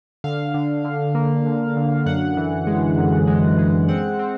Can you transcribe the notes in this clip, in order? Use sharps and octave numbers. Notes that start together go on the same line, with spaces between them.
D3 F5
D3
D3
A#3
D3
D3
F#2 F#5
E3
G#3
F#2
G#3
G#3
C4 F#5
C4